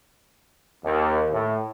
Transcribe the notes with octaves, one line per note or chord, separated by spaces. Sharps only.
D#2
A2